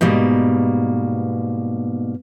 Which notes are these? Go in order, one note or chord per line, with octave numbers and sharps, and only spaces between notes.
G#2 B2 G3 A#3